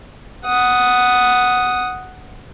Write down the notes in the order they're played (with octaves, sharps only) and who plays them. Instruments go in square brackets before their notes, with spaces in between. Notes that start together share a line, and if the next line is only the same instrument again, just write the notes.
[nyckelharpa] F#5 D#6